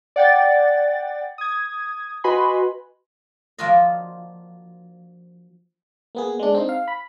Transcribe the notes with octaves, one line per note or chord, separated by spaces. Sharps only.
D5 F#5 G5 A6
D#6 G#6
F#4 B4 D#5 G#5 B5 C6
F3 A#3 D4 F4 F#4 D#5
A#3 B3 G#4
G#3 D4
C4 D#4
F5
B5